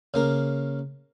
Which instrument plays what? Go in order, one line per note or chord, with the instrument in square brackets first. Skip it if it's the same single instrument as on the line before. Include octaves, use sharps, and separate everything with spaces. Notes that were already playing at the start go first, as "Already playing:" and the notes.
[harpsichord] C#3 A#3 A#4